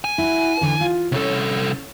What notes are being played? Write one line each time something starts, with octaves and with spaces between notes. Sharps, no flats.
G#5
E4 F#4
D3 E3
F4
C2 C#4 A4